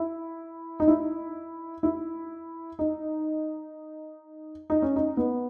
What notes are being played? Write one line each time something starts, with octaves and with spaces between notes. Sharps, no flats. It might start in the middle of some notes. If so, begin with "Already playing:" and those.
Already playing: E4
D#4
E4
E4
D#4
D#4
C#4
D#4
B3